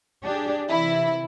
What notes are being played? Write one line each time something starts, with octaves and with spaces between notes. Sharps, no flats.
D4 G4 G#4
C3 E3 E4